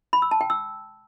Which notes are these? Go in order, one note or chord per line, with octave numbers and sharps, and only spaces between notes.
B5
E6
A5
G5
E6